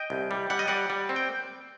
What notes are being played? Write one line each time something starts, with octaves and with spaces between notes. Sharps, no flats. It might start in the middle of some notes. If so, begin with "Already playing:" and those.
Already playing: D#5 G5
C2
G3
G3 F#5
D#5
G3 D5 F#5
G3
C4
G5